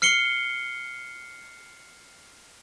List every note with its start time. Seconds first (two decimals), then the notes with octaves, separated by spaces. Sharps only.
0.02 F6 C7 C#7 G7